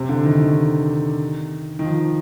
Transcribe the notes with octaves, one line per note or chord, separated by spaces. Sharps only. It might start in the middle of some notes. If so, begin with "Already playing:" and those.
Already playing: C3
D3
D#3
D#3
D#3
F3